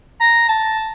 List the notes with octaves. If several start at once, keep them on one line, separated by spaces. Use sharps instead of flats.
A#5
A5